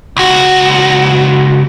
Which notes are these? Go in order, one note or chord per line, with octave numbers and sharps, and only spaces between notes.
C#2 F#4